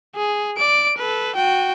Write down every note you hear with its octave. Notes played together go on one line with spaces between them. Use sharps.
G#4
D5 D7
A4 B4
F#4 G5